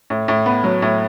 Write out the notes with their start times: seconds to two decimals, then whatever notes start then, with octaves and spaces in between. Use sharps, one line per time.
0.10 A2
0.28 A2
0.46 B3
0.64 F#3
0.82 A2